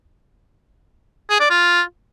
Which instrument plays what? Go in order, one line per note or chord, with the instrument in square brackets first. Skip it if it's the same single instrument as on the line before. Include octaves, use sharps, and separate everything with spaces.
[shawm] G#4
D5
F4